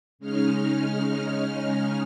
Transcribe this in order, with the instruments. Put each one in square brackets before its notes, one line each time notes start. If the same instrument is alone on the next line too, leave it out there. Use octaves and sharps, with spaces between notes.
[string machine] C#3 G#3 C#4 D#4 F6